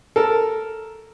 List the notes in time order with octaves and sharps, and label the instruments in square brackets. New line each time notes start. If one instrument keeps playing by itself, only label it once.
[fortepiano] A4 A#4